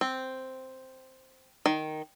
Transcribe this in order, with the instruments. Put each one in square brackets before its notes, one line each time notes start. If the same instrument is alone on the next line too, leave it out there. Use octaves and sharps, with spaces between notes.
[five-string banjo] C4
D#3